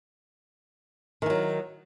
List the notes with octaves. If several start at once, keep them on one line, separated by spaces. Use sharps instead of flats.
D#3 E3 F#3